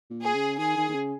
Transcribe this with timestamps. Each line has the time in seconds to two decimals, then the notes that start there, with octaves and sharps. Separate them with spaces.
0.10 A#2
0.22 G#4
0.34 C#3
0.58 D#3 G#4
0.77 D#3
0.89 D#3
0.95 C#3